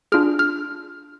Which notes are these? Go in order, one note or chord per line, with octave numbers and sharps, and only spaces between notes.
D4 F4 G#4 F6
F6